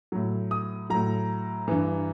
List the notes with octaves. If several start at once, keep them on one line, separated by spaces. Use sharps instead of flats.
A2 F#3
D#6
A2 F#3 A#5
G2 E3